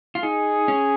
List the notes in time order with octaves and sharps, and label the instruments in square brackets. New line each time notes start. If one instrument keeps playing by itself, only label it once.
[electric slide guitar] F4
[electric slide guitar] D#4 [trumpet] G#4
[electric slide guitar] C#4